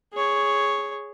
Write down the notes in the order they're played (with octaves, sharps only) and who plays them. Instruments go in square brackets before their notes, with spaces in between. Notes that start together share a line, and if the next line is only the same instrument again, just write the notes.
[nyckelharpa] G#4 C#5